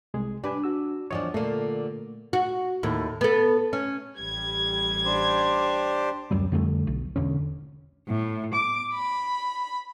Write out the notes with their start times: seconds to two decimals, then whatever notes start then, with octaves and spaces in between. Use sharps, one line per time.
0.14 C2 G#3 G#4
0.44 D4 G4 B4 G#5
0.64 F#4 E6
1.11 E2 F3 D4 C#5 D#5
1.34 A#2 D3 A3 A#3
2.33 F#4
2.83 D#2 A2
3.21 B3 A4
3.73 C#4
4.18 A1 G3 G#6
5.05 D4 G4 C5
6.31 D1 F#2 F#3 G3
6.52 F2 D3 G3 A3
6.87 B1
7.16 E1 D3 C#4
8.07 A2
8.53 D6
8.93 B5